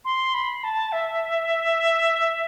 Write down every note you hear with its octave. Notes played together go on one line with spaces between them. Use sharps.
C6
B5
A5
E5